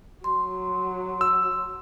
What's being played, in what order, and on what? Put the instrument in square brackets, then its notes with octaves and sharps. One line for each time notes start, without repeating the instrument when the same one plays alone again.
[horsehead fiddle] F#3 [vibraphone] C6
[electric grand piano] E6